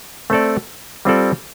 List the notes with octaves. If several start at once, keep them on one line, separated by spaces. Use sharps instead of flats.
A3 C4 A4 D5
G3 C4 F4 A4 D5